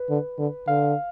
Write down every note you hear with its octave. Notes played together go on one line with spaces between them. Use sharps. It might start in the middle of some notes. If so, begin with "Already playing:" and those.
Already playing: B4
D3
D3
D3 F5